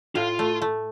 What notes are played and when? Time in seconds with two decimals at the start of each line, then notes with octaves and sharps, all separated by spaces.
0.15 A2 F4
0.39 A3
0.62 A3